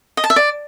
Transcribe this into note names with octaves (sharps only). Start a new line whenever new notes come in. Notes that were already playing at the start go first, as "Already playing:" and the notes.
D#5
A5
E5
D5